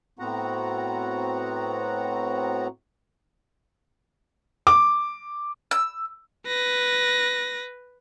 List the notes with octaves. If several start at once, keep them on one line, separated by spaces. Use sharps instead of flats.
A2 B3 C4 F#4 F#5 A#5
D6
E6
B4 A#6